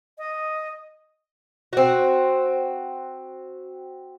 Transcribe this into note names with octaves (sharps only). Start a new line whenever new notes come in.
D#5
C4 F#4